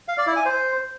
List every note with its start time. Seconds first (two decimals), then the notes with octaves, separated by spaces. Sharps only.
0.08 F5
0.18 D5
0.27 E4
0.36 G#5
0.46 C5